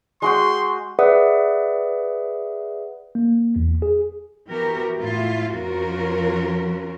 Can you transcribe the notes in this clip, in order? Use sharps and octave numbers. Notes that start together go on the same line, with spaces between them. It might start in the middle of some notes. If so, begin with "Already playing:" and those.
G#3 F#4 G5 C6
G#4 B4 D5 E5 F#5 D#6
A#3
E2
G#4
E3 B3 F#4 G4 A#4
A2 E4 F4
F2 F3 C#4 F4 F#4 A#4